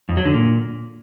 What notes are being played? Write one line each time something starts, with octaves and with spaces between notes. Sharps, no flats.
F2
F#3
D3
A#2